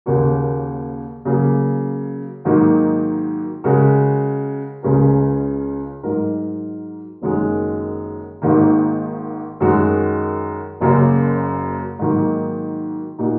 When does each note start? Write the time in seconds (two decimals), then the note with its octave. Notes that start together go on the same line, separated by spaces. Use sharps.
0.06 D#2 C#3 A#3 F#4 A#4
1.25 C#3 F#3 A#3
2.45 G#2 D#3 F#3 A#3 D#4
3.64 C#3 G#3 F#4 A#4
4.83 C#2 C#3 G#3 C#4 A#4
6.03 G#2 F#3 D#4 A#4
7.22 F#1 F#2 D#3 G#3 F#4
8.42 G#1 G#2 D#3 A#3
9.60 F#2 D#3 G#3 F#4
10.80 F#1 F#2 C#3 F#3 A#3
11.99 G#2 D#3 F#3 A#3
13.19 A#2 A#3 D#4 F#4